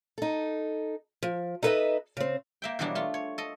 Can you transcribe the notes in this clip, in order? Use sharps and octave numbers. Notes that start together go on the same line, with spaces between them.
D#4 A4
F3
D#4 A4 B4 C5 D#5 E5
C#3 C4
A#3 E5 G5
B2 E3 F#3 G3 A#3 D4
A3 F4
C#5
A4 D#5